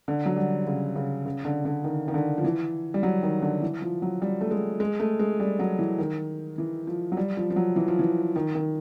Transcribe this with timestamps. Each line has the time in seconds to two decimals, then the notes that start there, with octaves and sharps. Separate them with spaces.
0.08 D3
0.26 F#3
0.36 G3
0.67 C#3
0.96 C#3
1.26 C#3
1.45 D3
1.65 D3
1.84 D#3
2.08 D#3
2.14 D3
2.38 F3
2.44 E3
2.94 G3
3.03 F#3
3.23 D#3
3.42 D3
3.62 E3
3.82 F3
4.02 F#3
4.22 G3
4.41 A3
4.51 G#3
4.80 G#3
5.00 A3
5.19 G#3
5.40 G3
5.59 F#3
5.79 E3
5.99 D#3
6.58 E3
6.87 F3
7.12 F#3
7.17 G3
7.37 F3
7.50 F3
7.56 F#3
7.76 E3
7.88 F3
7.99 E3
8.36 D#3
8.55 D#3